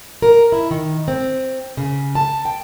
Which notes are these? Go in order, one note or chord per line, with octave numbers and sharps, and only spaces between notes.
A#4
E4
D#3
C4
C#3
A5
G5